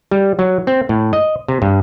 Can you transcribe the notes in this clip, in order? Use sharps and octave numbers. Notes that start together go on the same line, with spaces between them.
G3
F#3
C4
A2
D#5
C3
G2